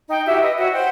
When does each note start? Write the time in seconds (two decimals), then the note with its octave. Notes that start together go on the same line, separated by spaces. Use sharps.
0.10 D#4 G5
0.26 E4 F#4 G4 E5
0.42 B4 D#5
0.58 F#4 C#5 E5
0.73 C5 F#5 G5